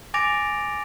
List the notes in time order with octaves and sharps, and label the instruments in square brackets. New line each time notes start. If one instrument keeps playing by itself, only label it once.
[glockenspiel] G#5 D6 A6 A#6 D7 F7